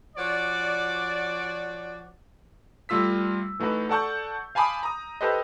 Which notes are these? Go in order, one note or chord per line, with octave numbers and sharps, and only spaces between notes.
F3 F#4 C#5 D5
G3 A3 F4 E6 B6
E3 A3 D#4 F#4 B4
A4 D5 F#5 A5 C#6 G6
F5 G#5 A5 B5 D6 D#6
A#5 D#6
G4 A4 B4 C5 D#5